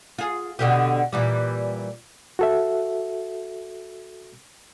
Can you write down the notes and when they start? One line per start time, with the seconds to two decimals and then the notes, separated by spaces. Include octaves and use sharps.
0.18 F4 G#4
0.59 B2 D3 G4
1.12 A#2 E3 G3
2.39 F#4 A4 E5